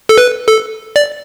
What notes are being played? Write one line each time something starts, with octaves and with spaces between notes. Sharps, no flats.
A4
B4
A4
D5